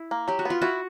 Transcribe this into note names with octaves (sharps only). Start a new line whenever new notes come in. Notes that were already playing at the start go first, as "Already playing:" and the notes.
Already playing: E4
A#3
F#3 G4
F#4
B3 F4
E4 F#4